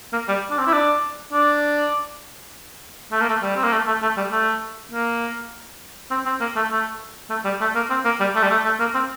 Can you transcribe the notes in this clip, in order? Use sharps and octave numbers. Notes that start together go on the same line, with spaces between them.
A#3
G3
D4
C4
E4
D4
D4
A3
A#3
A3
G3
C4
A#3
A3
A3
A3
G3
A3
A#3
C4
C4
A#3
A3
A3
A3
G3
A3
A#3
C4
A#3
G3
A3
G3
A3
A3
A#3
C4